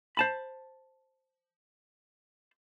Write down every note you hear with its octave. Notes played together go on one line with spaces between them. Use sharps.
C5 A5 B5